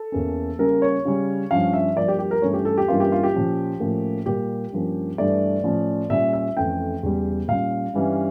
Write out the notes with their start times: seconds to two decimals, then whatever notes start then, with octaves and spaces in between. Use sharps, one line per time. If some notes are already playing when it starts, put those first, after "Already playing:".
Already playing: A4
0.12 E2 E3 A#3 C#4
0.58 C#3 G3 A#3 C#4 A#4
0.82 C#5
1.05 C#3 G3 C#4
1.51 G2 F3 C#4 F5
1.73 E5
1.96 G2 F3 A#3 D5
2.08 G4
2.19 G4
2.31 A#4
2.42 G2 E3 A3 C#4 C#5
2.53 G4
2.65 A4
2.77 G4
2.88 G2 E3 A#3 C#4 F4
3.00 G4
3.12 F4
3.23 G4
3.34 A#2 F3 C#4
3.80 A2 F3 A#3 C#4
4.26 A#2 G3 A#3 G4
4.72 G2 F3 A#3 C#4
5.18 G2 E3 A3 D5
5.64 A2 F3 C#4
6.10 A#2 G3 C#4 E5
6.33 E5
6.56 F2 E3 A3 C#4 G5
7.03 E2 C#3 G3
7.48 A#2 G3 C#4 F5
7.94 G2 E3 G3 C#4